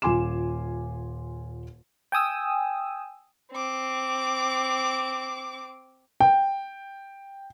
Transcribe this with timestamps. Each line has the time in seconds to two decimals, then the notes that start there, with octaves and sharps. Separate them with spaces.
0.02 D#1 F4 G#5 C6 D6 E7
2.12 G5 G#5 D#6 E6
3.52 C4 D6
6.20 G5